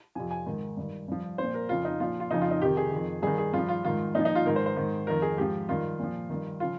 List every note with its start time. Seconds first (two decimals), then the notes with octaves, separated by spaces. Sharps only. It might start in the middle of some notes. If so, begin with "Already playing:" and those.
0.15 F2 C3 F3 G#5
0.31 G#5
0.46 G#2 D#3
0.77 G2 D#3
1.08 G2 F3
1.38 A#2 F3 C5
1.54 A#4
1.69 F2 C#3 F3 F4
1.85 D#4
2.00 A#2 F3 F4
2.20 F4
2.31 F2 C#3 F3 D#4
2.41 F4
2.51 D#4
2.61 F2 C3 D#3 G4
2.77 G#4
2.92 F2 D#3
3.23 G2 D#3 G#4
3.38 G#4
3.53 G2 F3 F4
3.69 F4
3.85 G#2 D#3 F4
4.15 A#2 D#4
4.19 F3
4.25 D#4
4.35 F4
4.46 G#2 D#3 A#4
4.56 C5
4.66 C5
4.77 G#2 D#3
5.07 F2 D#3 A#4
5.22 G#4
5.37 G#2 F3 G4
5.69 G2 D#3 F4
5.99 A#2 F3
6.30 G2 D#3
6.60 C#3 F3 F4